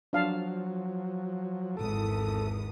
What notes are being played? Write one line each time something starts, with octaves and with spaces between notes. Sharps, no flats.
F3 F#3 D4 F5 A5
G#1 E2 A4 D#6